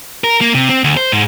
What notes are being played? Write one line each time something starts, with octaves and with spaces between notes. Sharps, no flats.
A#4
A#3
C3
C4
D2
C5
G#2